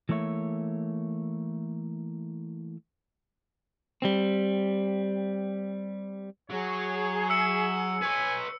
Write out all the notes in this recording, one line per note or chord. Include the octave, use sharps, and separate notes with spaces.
E3 A3 A#3 C#5 E5
G3 C4
F#3 G#4 C#5
E5 E6 C#7
B4 C#5 G#5